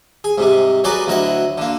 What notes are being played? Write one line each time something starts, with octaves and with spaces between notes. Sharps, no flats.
G#4
G#2 C3 G3
F#3 F#4 G#4 A#4 B4 D5
D2 F#3 E4 D#5 F#5
D3 A#3